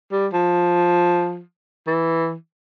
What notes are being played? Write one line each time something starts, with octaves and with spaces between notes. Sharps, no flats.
G3
F3
E3